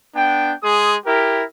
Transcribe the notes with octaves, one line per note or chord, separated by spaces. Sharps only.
B3 D4 G5
G#3 G#4 C6 D#6
E4 G4 A#4